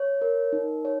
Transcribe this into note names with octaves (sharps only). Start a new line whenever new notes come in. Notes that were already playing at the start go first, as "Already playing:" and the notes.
Already playing: C#5
A#4
D#4
C#5